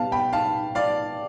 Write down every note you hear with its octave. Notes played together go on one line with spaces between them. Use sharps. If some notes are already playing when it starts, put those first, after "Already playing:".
Already playing: B2 G3 B3 F5 A5
G5 B5
F5 A5
D5 F5